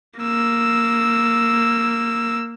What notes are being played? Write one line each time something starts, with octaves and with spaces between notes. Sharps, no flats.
A#3 E6